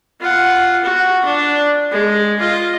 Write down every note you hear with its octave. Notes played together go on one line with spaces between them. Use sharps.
F4 F#5
F#4
D4
G#3
F4 D#5